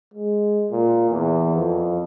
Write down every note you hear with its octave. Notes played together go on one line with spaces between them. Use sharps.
G#3
A#2
E2
F2